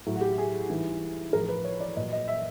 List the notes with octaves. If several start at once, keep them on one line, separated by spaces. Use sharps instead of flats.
A2 F#3
F#4
G4
G#4
G#2 E3 G3
A2 F3 A#4
B4
C#5
D5
A#2 F#3 D#5
D#5
E5